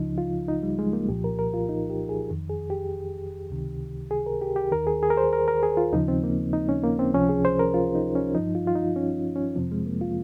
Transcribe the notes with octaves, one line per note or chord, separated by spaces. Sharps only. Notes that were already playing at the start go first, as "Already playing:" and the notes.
Already playing: C#2 C#3 F3 D#4
F4
D#4
G3
G#3
A#3
C2 A#2 F3 G4
A#4
A#4
F4
D#4
G4
G#4
F2 D#3
G#4
G4
C#2 C3 D#3
G#4
A#4
G4
G4
D#2 D#3 A#4
G#4
G#4
A#4
C5
A#4
A#4
G#4
F4
D#2 C#3 F3 D#4
C4
A#3
D#4
C#4
A#3
C4
C#2 C3 F3 C#4
G#4
C5
A#4
F4
D#4
C#4
G2 F3 D#4
F4
F4
D#4
C#4
C#4
F2 C3 F3 C4
G#3
A#3
F4